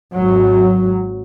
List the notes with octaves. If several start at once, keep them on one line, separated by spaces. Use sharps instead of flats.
G#1 F#3